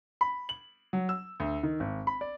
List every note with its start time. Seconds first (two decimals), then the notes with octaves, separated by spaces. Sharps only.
0.21 B5
0.49 F#7
0.93 F#3
1.09 E6
1.40 D2
1.63 D#3
1.80 G#1
2.07 B5
2.21 D5